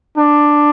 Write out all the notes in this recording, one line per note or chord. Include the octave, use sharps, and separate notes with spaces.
D4